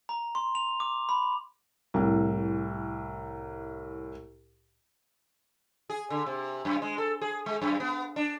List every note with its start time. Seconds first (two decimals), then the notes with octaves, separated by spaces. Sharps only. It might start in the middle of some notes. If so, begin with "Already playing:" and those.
0.09 A#5
0.35 C6
0.55 F7
0.80 D6
1.09 B5
1.94 C2 A2
5.90 G#4
6.10 D3
6.26 C3
6.65 F#2
6.82 G#3
6.98 A4
7.21 G#4
7.46 G#3
7.62 F#2
7.80 B3
8.16 D4